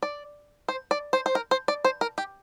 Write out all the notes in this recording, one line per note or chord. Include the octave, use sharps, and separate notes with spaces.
D5
C5
D5
C5
C5
A#4
C5
D5
C5
A#4
G4